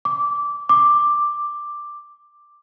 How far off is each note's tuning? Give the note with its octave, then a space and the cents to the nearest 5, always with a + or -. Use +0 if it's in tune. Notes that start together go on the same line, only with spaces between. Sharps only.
D6 -15
D6 +5